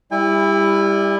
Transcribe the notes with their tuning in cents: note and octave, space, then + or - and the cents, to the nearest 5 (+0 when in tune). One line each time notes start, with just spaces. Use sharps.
G3 +20 E4 +0 G#5 -45